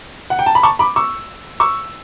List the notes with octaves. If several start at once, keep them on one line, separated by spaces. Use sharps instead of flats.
F#5
G5
A5
B5
A5 C#6
B5 D6
C#6 E6
C#6 E6